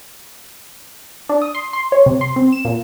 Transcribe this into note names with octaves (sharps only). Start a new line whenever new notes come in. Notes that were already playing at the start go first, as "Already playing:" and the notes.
D4
D#6
C6
C6
C#5
C3
C6
C4
E7
A#2